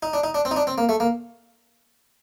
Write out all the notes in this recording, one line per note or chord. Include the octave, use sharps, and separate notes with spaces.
D#4
D4
D#4
D4
C4
D#4
D4
C4
A#3
A3
A#3